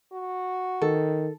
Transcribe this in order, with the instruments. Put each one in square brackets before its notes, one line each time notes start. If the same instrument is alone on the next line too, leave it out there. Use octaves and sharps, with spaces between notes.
[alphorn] F#4
[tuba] D#3 [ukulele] A4